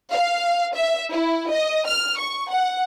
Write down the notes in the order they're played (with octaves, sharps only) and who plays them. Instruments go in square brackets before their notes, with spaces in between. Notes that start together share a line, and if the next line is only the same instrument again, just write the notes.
[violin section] F5
E5
E4
D#5
F6
C#6
F#5